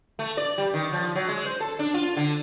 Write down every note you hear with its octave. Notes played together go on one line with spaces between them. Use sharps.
A3
D5
G3
D#3
F3
F#3
G#3
C5
A4
D4
F4
D3